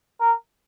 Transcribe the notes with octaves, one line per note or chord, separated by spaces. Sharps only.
A#4